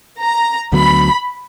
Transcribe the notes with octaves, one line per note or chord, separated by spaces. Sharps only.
A#5
D2 D3 F#3 B3 B5